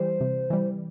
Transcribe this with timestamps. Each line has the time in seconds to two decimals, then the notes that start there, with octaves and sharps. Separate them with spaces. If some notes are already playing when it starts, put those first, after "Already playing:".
Already playing: E3 G3 C5
0.21 C3
0.50 E3 G3